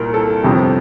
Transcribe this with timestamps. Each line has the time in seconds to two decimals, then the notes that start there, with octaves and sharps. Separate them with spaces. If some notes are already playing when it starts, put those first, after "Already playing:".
Already playing: C2 A#2 A#4
0.14 A4
0.44 G1 F2 C3 G4